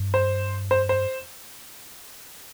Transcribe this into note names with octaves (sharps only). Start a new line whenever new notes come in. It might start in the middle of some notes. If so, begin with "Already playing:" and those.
Already playing: G2
C5
C5
C5